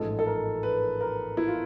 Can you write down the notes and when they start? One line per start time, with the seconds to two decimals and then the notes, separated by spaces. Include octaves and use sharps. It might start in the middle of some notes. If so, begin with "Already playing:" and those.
Already playing: A1 G#2 F3 G#3 A4
0.19 A4
0.26 A#4
0.63 B4
1.01 A#4
1.37 E4
1.48 F4